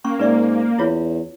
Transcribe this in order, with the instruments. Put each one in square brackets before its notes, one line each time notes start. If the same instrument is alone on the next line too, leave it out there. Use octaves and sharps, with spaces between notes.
[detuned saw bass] A#3 [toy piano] C#4 C#6
[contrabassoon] G#2 [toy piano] B4 D5 E5
[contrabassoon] E2 [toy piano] E4 F4 C#5